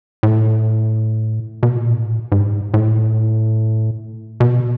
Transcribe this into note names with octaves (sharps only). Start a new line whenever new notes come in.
A2
B2
A#2
A2
G#2
A2
B2